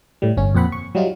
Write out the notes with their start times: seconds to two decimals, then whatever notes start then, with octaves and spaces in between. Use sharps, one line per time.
0.22 A2 G3
0.37 G1 C#4
0.55 F2 A#2 C4 F#5 B5 F#6
0.72 C#6
0.95 F#3 G3 D#4 F4